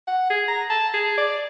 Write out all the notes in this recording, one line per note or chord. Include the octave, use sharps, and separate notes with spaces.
F#5
G#4
A#5
A5
G#4
D5